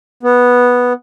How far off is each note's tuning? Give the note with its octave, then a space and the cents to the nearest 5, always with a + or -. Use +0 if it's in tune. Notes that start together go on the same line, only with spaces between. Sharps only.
B3 -5